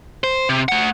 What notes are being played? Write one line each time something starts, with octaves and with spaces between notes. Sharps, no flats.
C5
C3
A3 F#5